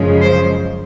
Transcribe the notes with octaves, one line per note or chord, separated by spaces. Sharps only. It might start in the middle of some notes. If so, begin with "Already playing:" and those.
Already playing: F#2 C#3 F3 G#3
C5